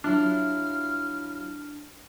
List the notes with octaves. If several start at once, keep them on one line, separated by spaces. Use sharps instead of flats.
F#3 D4 E4 F4 F6